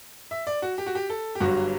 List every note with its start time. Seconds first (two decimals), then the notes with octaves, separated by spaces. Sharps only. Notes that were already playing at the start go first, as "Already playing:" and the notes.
0.31 E5
0.47 D5
0.62 F#4
0.78 G4
0.86 F#4
0.95 G4
1.10 A4
1.35 G4
1.40 G1 G2 F#3 F#4